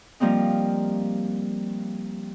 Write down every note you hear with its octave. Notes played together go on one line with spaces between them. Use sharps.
F3 G3 A#3 C4 D#4